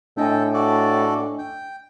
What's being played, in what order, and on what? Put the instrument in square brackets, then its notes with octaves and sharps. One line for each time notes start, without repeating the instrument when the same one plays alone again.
[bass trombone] A2 [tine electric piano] D4 D#5 G#5 [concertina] A4 G5
[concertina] F#4 A4 D5
G5